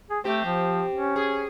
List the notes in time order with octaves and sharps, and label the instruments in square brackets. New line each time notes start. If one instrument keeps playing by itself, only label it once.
[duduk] G#4
[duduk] A3 [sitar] C4 G4
[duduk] F3
C#4
[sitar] G#4